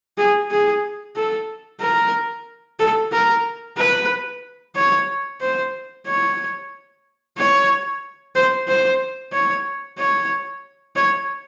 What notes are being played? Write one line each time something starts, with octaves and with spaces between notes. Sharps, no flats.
G#4
G#4
A4
A#4
A4
A#4
B4
C#5
C5
C#5
C#5
C5
C5
C#5
C#5
C#5